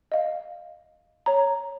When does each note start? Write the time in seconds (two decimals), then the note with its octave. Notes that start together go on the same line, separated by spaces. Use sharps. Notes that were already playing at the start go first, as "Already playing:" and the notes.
0.12 D#5 F5
1.26 C#5 A#5